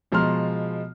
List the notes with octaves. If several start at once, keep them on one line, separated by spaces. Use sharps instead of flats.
B2 F3 G#3 A#5 C6 F6